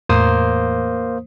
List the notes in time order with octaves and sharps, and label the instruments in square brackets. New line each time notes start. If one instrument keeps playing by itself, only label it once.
[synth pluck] E2 A2 [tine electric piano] A#3 C5 D#6